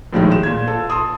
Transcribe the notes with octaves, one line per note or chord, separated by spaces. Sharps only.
A#1 A2 D#3 G#3
E7
A#2 G#6
F4 A4
A5 C6 D#6